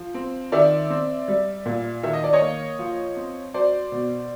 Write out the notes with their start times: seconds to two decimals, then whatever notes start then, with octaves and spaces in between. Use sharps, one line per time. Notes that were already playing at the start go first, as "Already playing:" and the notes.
Already playing: F3
0.14 C4
0.52 D#3 D5 E5
0.90 C4
1.28 G3
1.66 A#2
2.03 D#3 E5
2.13 D#5
2.24 D5
2.33 C#5 D#5
2.41 A#3
2.79 F3
3.17 C4
3.54 F#3 C5 D5
3.92 B2